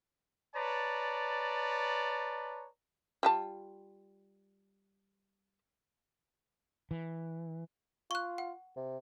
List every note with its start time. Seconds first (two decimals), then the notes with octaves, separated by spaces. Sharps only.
0.55 B4 C#5 D5 A5 A#5
3.23 G3 F4 A5
6.91 E3
8.11 F4 C#6 F#6
8.38 F#5
8.77 C3